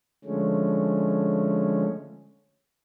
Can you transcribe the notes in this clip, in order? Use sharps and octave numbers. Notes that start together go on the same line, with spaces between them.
D3 F3 G#3 A3 C#4